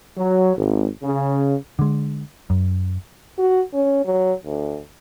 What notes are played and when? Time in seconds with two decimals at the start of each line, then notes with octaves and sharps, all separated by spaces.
0.16 F#3
0.57 G#1
1.03 C#3
1.79 D3 G#3
2.50 F#2
3.38 F#4
3.73 C#4
4.05 F#3
4.45 D2